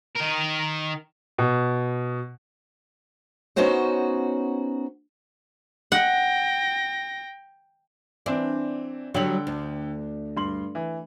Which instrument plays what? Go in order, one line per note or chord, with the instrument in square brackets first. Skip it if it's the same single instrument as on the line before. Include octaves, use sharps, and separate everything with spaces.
[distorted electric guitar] D#3 A#4
[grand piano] B2
[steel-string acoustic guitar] B3 C#4 D#4 F#4 C5 C#5
[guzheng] F#5 [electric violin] G5 A#6
[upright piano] E3 C4 [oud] D4
[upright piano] D3 G5 F#7 [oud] F#3 G3
[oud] D2
[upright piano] G2 C6 F#7
E3